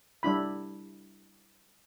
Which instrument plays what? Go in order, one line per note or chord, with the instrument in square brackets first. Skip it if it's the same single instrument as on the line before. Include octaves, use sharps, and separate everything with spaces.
[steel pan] G3 D4 E4 B5